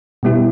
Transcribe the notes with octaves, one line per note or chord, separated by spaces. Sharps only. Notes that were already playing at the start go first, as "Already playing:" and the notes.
B2 G3 B3 E4 G4